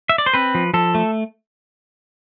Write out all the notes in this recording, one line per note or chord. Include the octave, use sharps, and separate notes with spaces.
E5
D5
C5
C4 B4
F3
F3 A4
A3